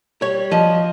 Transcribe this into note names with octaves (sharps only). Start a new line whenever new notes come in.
G3 C#5
F3 D#5